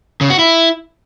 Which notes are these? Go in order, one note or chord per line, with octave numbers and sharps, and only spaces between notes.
C#3
F#4
E4